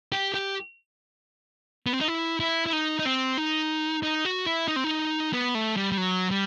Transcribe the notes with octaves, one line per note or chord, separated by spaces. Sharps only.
G4
G4
B3
C4
D#4
E4
E4
E4
D#4
D#4
C4
D#4
D#4
F#4
E4
D#4
C4
D#4
B3
A3
G3
G3
F#3
G3